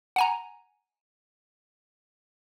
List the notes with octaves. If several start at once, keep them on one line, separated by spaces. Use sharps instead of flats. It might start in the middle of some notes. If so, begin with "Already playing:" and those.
F#5 G#5 A#5